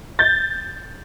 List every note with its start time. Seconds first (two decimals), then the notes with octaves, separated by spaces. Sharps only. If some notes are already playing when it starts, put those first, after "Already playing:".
0.19 G6 A6